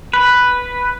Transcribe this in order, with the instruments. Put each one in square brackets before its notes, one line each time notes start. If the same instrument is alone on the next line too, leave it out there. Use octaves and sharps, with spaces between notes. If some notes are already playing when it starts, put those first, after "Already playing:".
[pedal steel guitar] B4